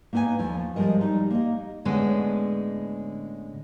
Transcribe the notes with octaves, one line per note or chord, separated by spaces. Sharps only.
A#3 B3 D#4 B4 G#5
D#2 F3 A3
F3 G3 G#3 A#4 D#5
G3 D#4
A#3 D#5
A2 D3 G#3 B3 C#4 G#4